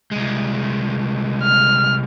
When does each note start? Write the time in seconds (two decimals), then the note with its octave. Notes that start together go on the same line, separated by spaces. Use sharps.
0.11 C2 G#3
1.43 F6